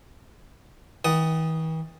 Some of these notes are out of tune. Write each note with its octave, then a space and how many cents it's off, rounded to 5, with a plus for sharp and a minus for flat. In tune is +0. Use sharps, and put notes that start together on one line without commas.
E3 -45 F#5 +25 D#6 +0